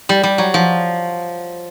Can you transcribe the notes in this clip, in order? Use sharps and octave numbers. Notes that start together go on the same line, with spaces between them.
G3
G3
F#3
F3